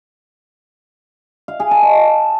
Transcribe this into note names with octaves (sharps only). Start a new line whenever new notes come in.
F5
G#4
A5
D#5